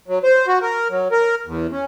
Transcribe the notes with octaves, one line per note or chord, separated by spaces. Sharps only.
F#3
C5
F#4
A#4
F#3
A#4
E2
C#4